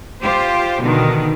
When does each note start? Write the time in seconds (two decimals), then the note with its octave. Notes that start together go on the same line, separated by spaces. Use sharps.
0.22 F4 G4 C5
0.82 B2 D3 D#3